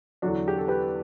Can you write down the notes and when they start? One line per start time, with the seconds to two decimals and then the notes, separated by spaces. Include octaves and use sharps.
0.22 E2 D3 F#3 D4 F#4
0.48 G4
0.58 A4
0.68 G4 B4